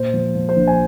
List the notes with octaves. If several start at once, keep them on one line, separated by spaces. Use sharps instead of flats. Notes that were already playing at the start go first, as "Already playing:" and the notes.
Already playing: A#2 C5
F3
F3
C5
A#1
G#5